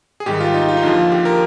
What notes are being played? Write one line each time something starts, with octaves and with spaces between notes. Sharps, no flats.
G#4
G#1 G#2 D#3 G3 G4
F4
D#4
F4
D#4
D#2 D3 F3 F4
G4
A#4